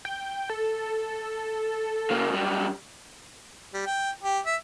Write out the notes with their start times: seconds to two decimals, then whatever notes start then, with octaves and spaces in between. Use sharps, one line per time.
0.05 G5
0.50 A4
2.11 C#3 A#3
2.31 F#2 G3
3.74 G3
3.86 G5
4.23 G4
4.46 E5